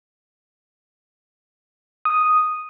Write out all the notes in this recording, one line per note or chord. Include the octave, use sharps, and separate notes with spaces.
D#6